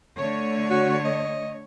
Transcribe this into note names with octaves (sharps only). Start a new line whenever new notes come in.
D3 A3 C#5
F#4
D#5